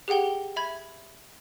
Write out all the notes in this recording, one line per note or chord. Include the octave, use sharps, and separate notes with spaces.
G4 G#4 F#5 G5 G7
E5 B5 G#6